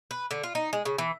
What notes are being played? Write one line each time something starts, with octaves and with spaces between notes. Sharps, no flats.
B4
D3
F4
D#4
G#3
C#3
E3